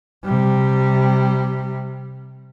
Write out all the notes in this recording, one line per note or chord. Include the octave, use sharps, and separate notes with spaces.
C3 G3